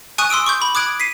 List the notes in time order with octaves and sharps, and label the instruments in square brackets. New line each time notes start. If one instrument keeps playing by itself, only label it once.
[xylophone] G#5 C#6 D#6 F#6 D#7
C6 D#6 E6 D7
C#6 D6 G6
B5
D6 D#6 F#6 G#6 D7
B6 C7 D#7